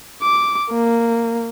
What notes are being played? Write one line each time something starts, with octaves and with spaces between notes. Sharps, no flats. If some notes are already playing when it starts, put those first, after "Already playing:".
D6
A#3